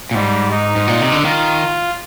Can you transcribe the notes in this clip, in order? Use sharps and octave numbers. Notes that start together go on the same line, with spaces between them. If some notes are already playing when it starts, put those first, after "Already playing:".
A#2
G#2 G3
D#4
G#2
A#2
C3
D3
D#3 F4